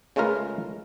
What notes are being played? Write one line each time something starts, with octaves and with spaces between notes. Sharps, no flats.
C#3 G#3 A3 F4 A#4 B4